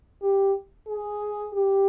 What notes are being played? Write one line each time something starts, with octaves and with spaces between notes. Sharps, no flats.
G4
G#4
G4